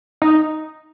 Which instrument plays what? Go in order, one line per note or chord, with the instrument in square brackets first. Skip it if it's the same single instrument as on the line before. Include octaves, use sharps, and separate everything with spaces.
[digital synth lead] D#4